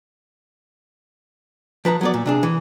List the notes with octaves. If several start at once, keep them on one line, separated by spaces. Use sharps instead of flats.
F3 B4 A5 A#5
F#3 B3 D5
A#2
C3 D4 G#4
E3